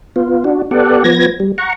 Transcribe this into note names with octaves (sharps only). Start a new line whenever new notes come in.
B3 F4
D4 F#4
B3 G4 A4 D5 F#5
F3 B3 G#6 A#6
G3
F#5 A#5 C#6